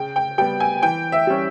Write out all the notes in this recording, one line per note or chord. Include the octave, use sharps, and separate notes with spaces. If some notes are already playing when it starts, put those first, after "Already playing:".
Already playing: C#3 G5
G5
G3 B3 G5
G#5
E3 G5
E5
G3 C#4